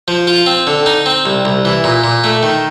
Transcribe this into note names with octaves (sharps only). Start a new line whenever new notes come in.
F3
F4
C4
D3
D#4
C4
C2
C2
E3
A#2
A#2
A3
D#3